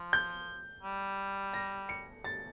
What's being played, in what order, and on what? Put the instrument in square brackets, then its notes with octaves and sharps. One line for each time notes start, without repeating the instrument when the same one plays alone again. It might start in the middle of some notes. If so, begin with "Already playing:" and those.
Already playing: [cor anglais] F3
[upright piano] G6
[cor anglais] G3
[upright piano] A#6
C#7
A6